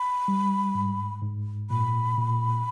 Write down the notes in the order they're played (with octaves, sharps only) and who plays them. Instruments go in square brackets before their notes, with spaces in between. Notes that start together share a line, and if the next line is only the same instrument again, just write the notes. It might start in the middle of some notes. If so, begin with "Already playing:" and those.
Already playing: [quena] B5
[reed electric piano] G3
G#2
G#2
[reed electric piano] A#2 [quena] B5
[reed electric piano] A#2